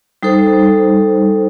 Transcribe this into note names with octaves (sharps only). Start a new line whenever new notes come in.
G3 D#4 A4 C5